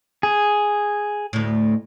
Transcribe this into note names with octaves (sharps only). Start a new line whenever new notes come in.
G#4
D2 A2